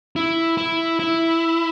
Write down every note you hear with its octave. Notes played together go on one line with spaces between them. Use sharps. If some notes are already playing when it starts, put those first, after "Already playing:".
E4
E4
E4